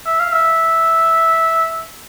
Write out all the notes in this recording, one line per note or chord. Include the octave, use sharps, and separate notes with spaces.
E5
F5
E5